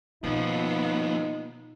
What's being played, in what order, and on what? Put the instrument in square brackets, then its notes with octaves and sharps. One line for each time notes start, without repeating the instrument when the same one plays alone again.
[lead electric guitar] D#2 F3 [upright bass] B2 [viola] B3 [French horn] D#4